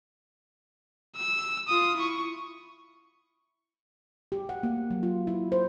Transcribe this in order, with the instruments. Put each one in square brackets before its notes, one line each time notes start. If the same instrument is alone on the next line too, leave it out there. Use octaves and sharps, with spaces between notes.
[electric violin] E6
F4 D#6
E4 C#6
[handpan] G4
F#5
A#3
F#3
F4
E4
C5